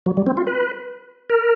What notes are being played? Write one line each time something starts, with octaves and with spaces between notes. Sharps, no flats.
F#3
G3
C4
F4
B4
A#4